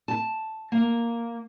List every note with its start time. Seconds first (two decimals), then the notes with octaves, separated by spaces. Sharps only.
0.08 A5
0.72 A#3